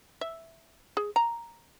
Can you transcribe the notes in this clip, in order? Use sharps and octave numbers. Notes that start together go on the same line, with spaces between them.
E5
G#4
A#5